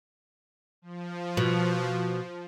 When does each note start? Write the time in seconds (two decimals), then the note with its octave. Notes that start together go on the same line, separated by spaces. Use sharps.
0.82 F3
1.37 B2